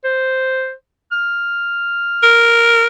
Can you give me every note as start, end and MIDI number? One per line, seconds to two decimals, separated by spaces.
0.04 0.73 72
1.11 2.73 89
2.23 2.87 70